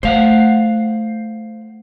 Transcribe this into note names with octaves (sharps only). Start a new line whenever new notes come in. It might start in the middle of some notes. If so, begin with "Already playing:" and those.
A3 C5 F5 F#5